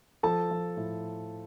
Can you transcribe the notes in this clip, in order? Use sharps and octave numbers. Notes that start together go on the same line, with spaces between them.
F3 A4 A5
F3
A2